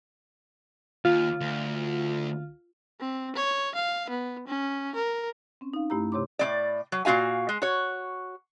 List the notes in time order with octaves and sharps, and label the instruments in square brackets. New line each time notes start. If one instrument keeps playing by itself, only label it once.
[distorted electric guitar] D#2 [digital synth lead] F4
[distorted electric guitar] D2
[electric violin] C4
C#5
F5
B3
C#4
A#4
[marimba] C4 C#4
D#4 F5
G2 A3 E4 G4 A#5
C3 G4 C#5 C6 D6
[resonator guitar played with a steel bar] A2 G#3 D5
F#3
A#2 B3 F#4 F5 G#5
G#3
F#4 C#5